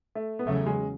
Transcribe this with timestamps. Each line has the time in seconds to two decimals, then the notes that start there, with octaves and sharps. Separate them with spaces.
0.15 A3
0.39 B3
0.46 E2 C#3 F#3 A3 C#4
0.66 G#3